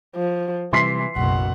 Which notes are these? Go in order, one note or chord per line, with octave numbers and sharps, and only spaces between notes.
F3
C3 E3 G3 C6 B6 C7
F#1 B1 B2 F#5